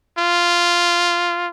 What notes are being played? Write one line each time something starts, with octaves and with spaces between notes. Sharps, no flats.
F4